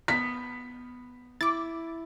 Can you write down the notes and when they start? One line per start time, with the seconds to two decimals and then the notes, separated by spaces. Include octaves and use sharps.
0.08 B3 B6
1.41 E4 D6 A6